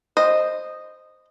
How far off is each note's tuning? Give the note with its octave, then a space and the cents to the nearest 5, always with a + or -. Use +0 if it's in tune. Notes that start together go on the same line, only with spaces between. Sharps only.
C5 +0 D#5 -10